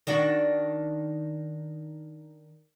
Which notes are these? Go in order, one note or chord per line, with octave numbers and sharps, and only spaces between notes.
D#3 D4 F#4